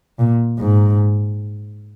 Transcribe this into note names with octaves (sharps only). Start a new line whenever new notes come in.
A#2
G#2